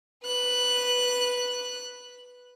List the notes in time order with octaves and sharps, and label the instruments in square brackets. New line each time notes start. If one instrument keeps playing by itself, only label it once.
[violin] B4 F#6